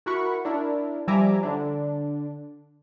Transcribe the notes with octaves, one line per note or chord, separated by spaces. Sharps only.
E4 F#4 A#4 F#5 B5 C#6
D4 E4 A#4
F3 G3 E5 G#5 A#5 D6
D3 D4